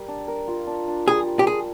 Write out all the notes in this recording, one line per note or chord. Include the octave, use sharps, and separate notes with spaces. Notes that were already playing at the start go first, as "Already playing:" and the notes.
Already playing: G3 A#4
D4
A#4
F4
D4
D4
G3 G#4
G3
G4
F4 G#4